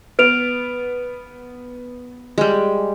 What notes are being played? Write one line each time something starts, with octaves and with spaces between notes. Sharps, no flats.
B3 F6 D7 F7
G3 G#3